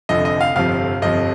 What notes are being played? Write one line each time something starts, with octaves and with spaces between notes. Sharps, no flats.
F1 F2 D3 F3 D#5
D#5
F5
G1 F2 C3 F3 F5
G1 F2 C3 F3 D#5